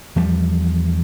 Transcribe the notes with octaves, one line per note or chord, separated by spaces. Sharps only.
E2 F3 G3